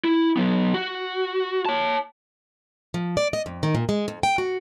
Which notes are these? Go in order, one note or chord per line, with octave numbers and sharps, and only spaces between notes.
E4
F#3 B3
F#4
C#5 A5
F3
D5
D#5
F2
D#3
A#2
G#3
F2
G5
F#4